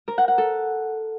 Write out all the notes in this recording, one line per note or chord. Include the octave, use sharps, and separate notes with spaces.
A#4
F#5
F#5
A4